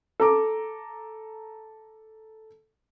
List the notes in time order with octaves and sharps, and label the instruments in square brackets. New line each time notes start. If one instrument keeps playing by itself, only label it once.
[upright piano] A4 A#5 D6